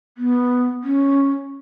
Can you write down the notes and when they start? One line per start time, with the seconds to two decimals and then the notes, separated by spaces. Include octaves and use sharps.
0.18 B3
0.83 C#4